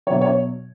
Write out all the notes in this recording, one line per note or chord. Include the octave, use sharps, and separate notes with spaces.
B2 F#3 C#5
C#5